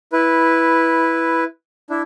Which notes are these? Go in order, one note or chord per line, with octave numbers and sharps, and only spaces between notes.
E4 B4
D4 E4